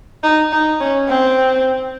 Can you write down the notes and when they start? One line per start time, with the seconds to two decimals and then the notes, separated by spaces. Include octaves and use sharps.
0.23 D#4
0.52 D#4
0.80 C#4
1.09 C4